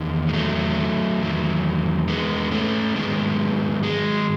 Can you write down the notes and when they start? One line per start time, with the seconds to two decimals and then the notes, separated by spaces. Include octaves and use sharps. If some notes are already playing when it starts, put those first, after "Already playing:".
Already playing: E2 D#3
0.29 G#3
0.33 F#3 A3
1.21 E2 D#3 F#3
2.08 G#3 B3
2.51 A3 C#4
2.95 G#2 D#3 F#3 G#3 B3
3.83 G#3